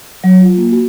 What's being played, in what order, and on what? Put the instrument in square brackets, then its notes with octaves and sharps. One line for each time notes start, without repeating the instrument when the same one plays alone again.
[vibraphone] F#3
F4
A#3
F#4